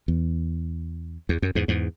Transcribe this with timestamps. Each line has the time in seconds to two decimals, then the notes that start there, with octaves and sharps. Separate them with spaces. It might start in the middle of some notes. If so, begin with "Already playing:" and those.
0.08 E2
1.29 E2
1.42 F#2
1.55 E2 G#2
1.68 E2 G#2